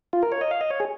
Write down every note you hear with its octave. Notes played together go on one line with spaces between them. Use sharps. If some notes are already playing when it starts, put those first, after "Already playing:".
F4
A#4
C#5
D#5
F5
D#5
C#5
G#4